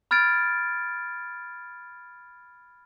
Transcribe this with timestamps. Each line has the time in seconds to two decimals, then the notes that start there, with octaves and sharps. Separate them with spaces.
0.11 B5 F6 G#6 A6 D7